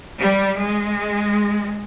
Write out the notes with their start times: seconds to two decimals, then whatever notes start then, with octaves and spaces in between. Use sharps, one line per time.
0.19 G3
0.58 G#3